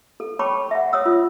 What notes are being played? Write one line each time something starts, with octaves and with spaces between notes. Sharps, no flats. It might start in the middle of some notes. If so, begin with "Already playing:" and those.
A4
C#5 G5 A5 B5 C#6 D6
E5 F#5
C#5 D#6 E6
F4